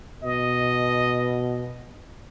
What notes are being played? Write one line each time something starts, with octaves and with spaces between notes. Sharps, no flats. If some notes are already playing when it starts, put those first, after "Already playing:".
B2 D#5